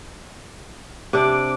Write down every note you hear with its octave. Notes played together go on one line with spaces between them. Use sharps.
C3 D4 D6